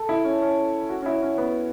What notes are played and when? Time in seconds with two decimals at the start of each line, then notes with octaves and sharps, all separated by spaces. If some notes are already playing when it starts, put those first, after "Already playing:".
Already playing: A4
0.09 E4
0.24 C#4
0.42 C#4
0.89 F#4
1.02 C#4
1.06 E4
1.22 C#4
1.38 B3